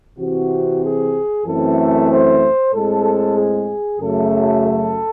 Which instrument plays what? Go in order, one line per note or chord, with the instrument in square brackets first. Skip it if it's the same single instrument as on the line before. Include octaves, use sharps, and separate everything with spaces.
[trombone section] C3 E3 C4 F#4
G#4
F#2 E3 A3 C4 A4
C5
A2 G#3 C4 A4
G#4
F#2 C#3 F#3 A3 A4
A4